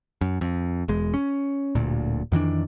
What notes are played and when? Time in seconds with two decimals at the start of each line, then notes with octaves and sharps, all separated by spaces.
0.21 F#2
0.41 F2
0.88 E1 E2 G#3
1.14 C#4
1.75 D1 D2 A#2
2.32 F2 D#3 E3 D4